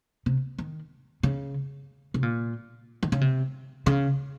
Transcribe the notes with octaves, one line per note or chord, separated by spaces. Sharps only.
C3
D#3
C#3
C3
A#2
D#3
C#3
C3
C#3